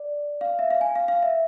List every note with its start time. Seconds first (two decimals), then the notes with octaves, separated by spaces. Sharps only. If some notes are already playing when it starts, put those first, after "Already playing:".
Already playing: D5
0.41 F5
0.59 E5
0.70 F5
0.81 G#5
0.95 F5
1.08 F5
1.22 E5